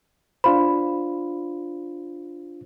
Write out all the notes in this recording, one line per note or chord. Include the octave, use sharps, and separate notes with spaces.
D4 F4 C5 B5